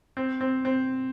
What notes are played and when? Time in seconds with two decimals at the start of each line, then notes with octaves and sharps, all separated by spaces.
0.17 C4
0.41 C4
0.65 C4